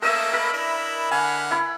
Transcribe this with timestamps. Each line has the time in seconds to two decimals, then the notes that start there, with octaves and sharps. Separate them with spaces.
0.02 A3 A#3 C#4 A#4 D#5 E5 E6
0.33 A#4 B5
0.53 D4 E4
1.11 D3 F#5 G#5 F6
1.51 E4 B5